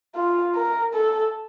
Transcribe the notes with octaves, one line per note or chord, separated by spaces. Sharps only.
F4
A#4
A4